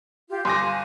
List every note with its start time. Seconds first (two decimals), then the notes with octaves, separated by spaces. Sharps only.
0.29 F4 G4
0.45 G1 F5 G#5 C6 D6 A#6